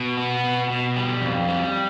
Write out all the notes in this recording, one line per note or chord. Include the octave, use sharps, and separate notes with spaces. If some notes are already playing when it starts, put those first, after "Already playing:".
Already playing: B2
B3
B2
B2
G3
F2
G3